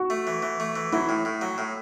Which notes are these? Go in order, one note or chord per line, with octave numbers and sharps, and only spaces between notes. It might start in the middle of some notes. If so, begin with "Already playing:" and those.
Already playing: F#4
A3
E3
E3
A3
E3
F#3 E4
A2
A2
F#3
A2